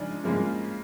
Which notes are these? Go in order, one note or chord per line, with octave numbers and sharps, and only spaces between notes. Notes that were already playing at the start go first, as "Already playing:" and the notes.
Already playing: C#3 F3 G#3 D4 D#4
C#3 F3 G#3 A#3